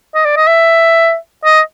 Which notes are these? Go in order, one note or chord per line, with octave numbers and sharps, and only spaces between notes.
D#5
D5
D#5
E5
D#5